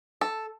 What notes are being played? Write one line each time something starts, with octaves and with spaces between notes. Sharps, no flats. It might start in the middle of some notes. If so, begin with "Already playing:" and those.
A4